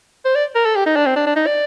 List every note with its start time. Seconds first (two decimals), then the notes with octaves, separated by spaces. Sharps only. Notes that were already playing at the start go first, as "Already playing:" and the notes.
0.25 C5
0.35 D5
0.55 A#4
0.65 A4
0.76 G4
0.86 D#4
0.96 D4
1.06 C4
1.16 D4
1.26 D4
1.36 D#4
1.46 D5